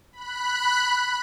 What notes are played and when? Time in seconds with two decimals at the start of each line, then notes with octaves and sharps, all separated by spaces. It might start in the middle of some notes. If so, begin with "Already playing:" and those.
0.12 B5 F#6